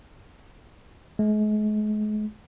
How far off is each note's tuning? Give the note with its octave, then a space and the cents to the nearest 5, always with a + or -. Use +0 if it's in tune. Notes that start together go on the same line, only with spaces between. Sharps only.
G#3 +40